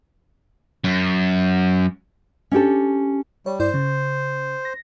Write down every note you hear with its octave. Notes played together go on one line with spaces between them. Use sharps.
F#2
C#4 D4 G4 A4
G3 C#5
G2 E4 C5 D5
C#3
A#6